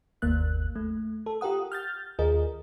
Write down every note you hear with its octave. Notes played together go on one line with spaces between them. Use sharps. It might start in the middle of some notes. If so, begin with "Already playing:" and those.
G1 D#2 A#3 F#6
A3
A4
F4 G4 A#4 F#5 D#6
F6 G6 A6
D#2 F4 G#4 A#4 D#5